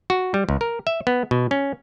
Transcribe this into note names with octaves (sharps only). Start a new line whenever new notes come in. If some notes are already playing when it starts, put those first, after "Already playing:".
F#4
G3
C#2
A#4
E5
B3
B2
C#4